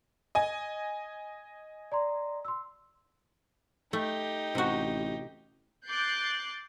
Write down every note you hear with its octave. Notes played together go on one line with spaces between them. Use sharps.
D#5 G#5
D5 A#5 C6
C6 E6
A3 D#4 G4
A1 C3 F#4
D6 F#6 G6 A6 C7